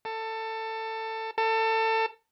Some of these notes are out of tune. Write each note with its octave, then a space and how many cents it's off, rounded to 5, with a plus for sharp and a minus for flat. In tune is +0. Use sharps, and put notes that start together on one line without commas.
A4 +20
A4 +25